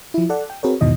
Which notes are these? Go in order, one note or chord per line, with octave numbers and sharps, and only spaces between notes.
F3 E4
A4 D5 F#5
G5
C4 F#4 G#4 A#4 B4 C#5
E2 G#2 B2 D#3 E3 D#5